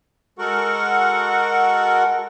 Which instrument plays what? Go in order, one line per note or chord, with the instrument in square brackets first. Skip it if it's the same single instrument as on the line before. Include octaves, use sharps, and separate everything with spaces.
[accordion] G#3 F#4 A4 A#4 F#5 C#6